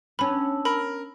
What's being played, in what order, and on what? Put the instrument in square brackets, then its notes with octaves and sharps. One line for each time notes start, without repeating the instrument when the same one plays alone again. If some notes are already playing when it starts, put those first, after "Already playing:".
[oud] B3 C#4 [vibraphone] D4 A5 E6 [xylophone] B5
[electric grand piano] A#4 [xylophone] B5